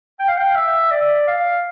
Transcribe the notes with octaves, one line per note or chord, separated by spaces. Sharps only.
G5
F5
G5
E5
D5
F5